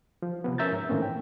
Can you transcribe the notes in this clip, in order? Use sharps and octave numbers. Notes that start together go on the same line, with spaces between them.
F3
C3 F3 B3
C#4 A#4 E5 A#5 G6 A6
G#2
A2 D#3 E3 A#3 C4 C#4
G5